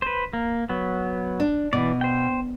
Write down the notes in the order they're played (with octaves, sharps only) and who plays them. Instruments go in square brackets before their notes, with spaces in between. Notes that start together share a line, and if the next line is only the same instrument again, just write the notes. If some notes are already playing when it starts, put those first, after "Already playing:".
[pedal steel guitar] B4 C5
A#3
F#3 B3
[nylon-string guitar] D4
[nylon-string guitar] B2 [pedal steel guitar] E3 D5
[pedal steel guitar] C5 G5